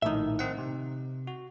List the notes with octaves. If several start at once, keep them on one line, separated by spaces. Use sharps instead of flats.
A#1 A2 D#3 D#4 E5
D#3 C4 F#5
C3
F#4